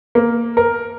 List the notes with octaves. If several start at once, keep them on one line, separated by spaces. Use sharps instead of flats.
A#3
A#4